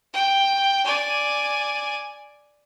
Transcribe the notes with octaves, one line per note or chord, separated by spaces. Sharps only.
G5
D5 G#5